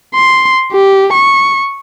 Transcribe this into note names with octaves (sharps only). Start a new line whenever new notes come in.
C6
G4
C#6